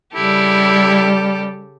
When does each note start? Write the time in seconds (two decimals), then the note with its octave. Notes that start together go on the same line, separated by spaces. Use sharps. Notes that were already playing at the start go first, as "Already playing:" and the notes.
0.15 C#3 G3 E4 G4 A4